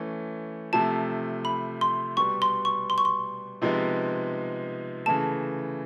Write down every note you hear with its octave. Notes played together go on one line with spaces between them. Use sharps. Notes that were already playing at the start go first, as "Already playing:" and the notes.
Already playing: E3 A3 C#4
C3 F3 A3 A5
B5
C6
B2 G3 B3 C#6
C6
C#6
C6
C#6
C6
C3 F3 G#3 B3 D#4
C#3 E3 A3 A5